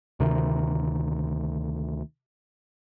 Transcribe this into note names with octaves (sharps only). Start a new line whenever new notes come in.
D2 C3 D#3